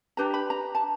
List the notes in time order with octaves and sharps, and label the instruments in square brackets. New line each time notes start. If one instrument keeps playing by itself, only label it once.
[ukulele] D4 G4 B4 A#5
B5
A#5
A5